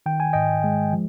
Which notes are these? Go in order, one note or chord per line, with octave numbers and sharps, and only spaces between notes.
D#3 G5
G#5
G#2 D#5 G5
G#3
F3